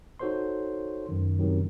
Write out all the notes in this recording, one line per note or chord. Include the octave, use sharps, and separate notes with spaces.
D#4 F#4 A4 C5 C#5 C6
F#2 D#3
F#2 C3 D#3 F#3